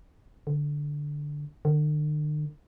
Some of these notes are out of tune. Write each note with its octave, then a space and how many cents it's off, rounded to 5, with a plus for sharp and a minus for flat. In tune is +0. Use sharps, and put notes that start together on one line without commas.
D3 +0
D3 +45